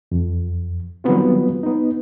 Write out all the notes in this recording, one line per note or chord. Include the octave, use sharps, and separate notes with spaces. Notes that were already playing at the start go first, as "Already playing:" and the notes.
F2
D#3 F#3 G3 B3 C4 F4
B3 D#4